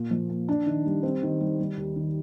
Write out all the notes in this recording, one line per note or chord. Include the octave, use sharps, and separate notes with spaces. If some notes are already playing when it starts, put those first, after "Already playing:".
Already playing: A#2 A#3
F3
A#3
D4
D#3
G3
C4
D#3
G3
G3
D#2
D#3